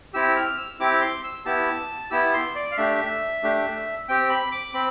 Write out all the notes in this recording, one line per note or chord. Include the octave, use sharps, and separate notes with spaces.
C4 E4 G4 E6
F6
E6
C4 E4 G4 D6
C6
E6
B3 E4 G4 A5
B3 E4 G4 E6
C6
D5
F5
A3 D4 G4 E5
A3 D4 G4
C4 G4 G5
B5
D6
C4 B5